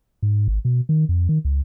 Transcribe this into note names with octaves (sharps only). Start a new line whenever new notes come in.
G#2
G#1
B2
D#3
F2
D#3
C#2